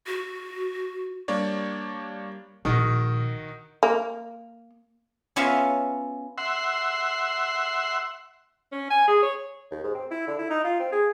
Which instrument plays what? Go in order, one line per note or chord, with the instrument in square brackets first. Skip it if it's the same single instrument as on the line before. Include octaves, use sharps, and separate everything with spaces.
[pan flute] F#4
[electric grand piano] G3 A#3 D4 C#5 D5
[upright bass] A#1 [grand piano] D#3 D#4 F#4
[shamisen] A#3
[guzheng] B3 C#4 F4 E5 F5
[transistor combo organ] E5 F#5 C6
[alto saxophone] C#4
G#5
G#4
C#5
[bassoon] D#2
G#2
C4
E4
D3
E4
D#4
F4
C4
G#4